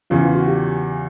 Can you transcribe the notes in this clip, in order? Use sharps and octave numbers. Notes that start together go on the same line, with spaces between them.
E2 C#3 E3 F4
F4
F#4
G4